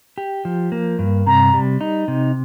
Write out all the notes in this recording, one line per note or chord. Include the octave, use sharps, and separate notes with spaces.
G4
F3
A#3
G2
C3 A#5
G3
D#4
C3